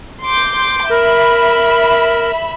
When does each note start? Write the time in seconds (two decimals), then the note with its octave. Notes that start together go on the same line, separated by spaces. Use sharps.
0.25 C6 D6 G6
0.90 A#4 E5 B5